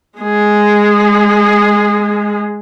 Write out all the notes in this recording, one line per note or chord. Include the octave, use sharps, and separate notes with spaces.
G#3 G#4